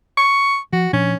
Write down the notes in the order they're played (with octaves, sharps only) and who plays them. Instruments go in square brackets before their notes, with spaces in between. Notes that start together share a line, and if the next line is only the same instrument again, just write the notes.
[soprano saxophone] C#6
[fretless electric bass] F3 [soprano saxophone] F#4
[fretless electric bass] A#2 F3 D4 [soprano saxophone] C#4